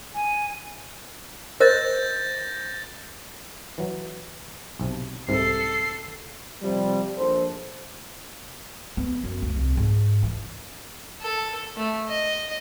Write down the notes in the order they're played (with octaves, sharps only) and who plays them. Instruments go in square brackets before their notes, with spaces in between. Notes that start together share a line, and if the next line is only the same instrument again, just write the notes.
[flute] G#5
[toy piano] A#4 C5 D#5 [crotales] G6 A6 A#6
[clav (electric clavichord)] E3 F#3
B1 C3
[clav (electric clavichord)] C2 G#2 C3 [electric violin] A4 C7
[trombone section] C3 F3 G3
A#1 A4 C5
[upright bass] B3
F#2
D2
C2
G#2
E3
[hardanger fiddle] A4
A3
D#5